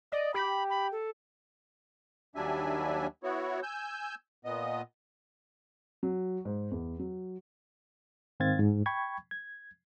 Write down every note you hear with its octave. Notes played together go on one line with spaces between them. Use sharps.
D5 D#5
G4 B5
B5
A4
D#2 F#3 G3 D4 E5 G#5
B3 E4 F#4 C#5
G#5 E6 G6
A#2 B3 D#5
F#3
G#2
E2
F#3
G#2 D#3 C4 F5 G#6 A6
G#2
G5 B5 C#6 G#6
G#6